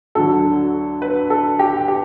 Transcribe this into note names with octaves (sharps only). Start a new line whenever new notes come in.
D2 D3 F#3 A4
B4
A4
G4
G4